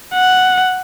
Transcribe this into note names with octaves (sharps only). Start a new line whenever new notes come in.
F#5